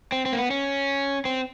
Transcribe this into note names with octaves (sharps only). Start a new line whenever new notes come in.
C4
C4
A#3
B3
C#4
C4